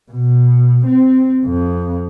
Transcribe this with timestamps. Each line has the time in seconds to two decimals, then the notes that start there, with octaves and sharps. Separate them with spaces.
0.11 B2
0.86 C4
1.46 F2